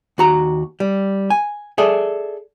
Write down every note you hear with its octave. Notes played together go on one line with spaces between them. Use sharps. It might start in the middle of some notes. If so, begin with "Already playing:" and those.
D#2 F#4 A#5
G3
G#5
G#4 A4 D5 E5